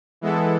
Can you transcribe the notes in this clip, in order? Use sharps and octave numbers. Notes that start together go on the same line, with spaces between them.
E3 G#3 B3 E4 A4